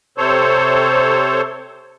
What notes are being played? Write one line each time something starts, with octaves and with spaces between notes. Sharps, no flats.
C3 A4 C5 C#5